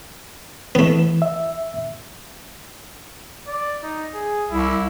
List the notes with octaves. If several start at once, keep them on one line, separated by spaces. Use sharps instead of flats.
E3 A3 B3
E5
D5
D#4
G#4
C2 E4